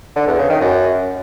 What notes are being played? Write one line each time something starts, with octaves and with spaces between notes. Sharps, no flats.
D3
E2
C#3
D#3
F#2